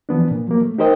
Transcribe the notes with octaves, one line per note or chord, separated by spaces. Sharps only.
E3 F3 B3 D4
A#2
F3 F#3 A#3
A3
D#4 G4 A#4 C5 D#5 G5